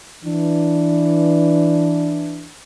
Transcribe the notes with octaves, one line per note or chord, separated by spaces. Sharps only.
E3 D4